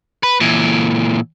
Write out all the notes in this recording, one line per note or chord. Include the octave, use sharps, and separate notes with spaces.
B4
A#2 E3